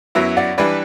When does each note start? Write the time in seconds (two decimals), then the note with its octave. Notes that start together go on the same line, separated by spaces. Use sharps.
0.15 F#2 F#3 B3 E4
0.37 D5 F#5
0.58 E3 G3 D4 B4 D5